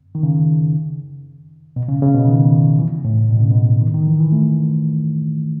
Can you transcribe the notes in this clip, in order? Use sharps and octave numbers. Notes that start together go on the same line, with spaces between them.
D#3
C#3
B2
C#3
C#3
B2
D#3
E3
A2
B2
C#3
B2
D#3
D#3
E3
E3
A3